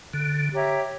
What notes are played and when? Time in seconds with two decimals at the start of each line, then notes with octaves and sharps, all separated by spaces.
0.13 D3
0.53 G4 C#5 E5 A#5